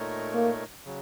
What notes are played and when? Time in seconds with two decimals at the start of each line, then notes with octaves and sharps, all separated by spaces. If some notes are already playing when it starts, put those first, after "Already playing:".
Already playing: A#2 A3 D#4 A#4 C#5
0.34 A#3
0.85 C#3 F#3